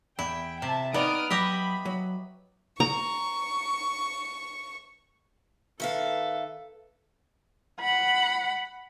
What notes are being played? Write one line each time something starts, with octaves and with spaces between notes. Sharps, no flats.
E2 E4 G5
C3 E5 A5
B3 D#4 D5 D#6 F6 D7
F#3 G4 D#5 E5 B5
F#3
A#5 C#6
D#3 A4 B4 E5 F5
F#5 B5